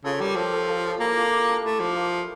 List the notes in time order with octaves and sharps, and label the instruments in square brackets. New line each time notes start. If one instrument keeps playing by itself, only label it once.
[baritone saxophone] C#3 [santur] F4 A4
[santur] C#5
[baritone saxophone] G3 [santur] G4 A#4
[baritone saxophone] F3 [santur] A4 C#5
[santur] A4 C#5
F4 A4
[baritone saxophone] A#3 [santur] E4 G4
[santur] D4 F4
E4
D4
[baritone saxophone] A3 [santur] E4
[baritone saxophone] F3 [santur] D4
[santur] A#3
A3